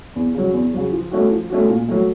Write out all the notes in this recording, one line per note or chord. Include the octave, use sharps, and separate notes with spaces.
E2
C#3 F#3
E2
C#3 F#3
F3
A3 C#4 F#4
F3
A3 C#4 F#4
A#2
F#3 A3